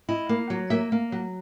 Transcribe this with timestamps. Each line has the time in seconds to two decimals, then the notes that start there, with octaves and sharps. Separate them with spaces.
0.09 E4 D#5
0.29 A#3
0.50 F#3
0.70 A#3 E5
0.92 A#3
1.12 F#3